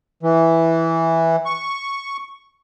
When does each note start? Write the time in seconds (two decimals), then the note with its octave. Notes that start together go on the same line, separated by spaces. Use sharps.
0.23 E3
1.46 C#6